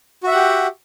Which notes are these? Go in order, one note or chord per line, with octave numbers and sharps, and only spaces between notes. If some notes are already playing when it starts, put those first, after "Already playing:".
F#4 G4 E5 F#5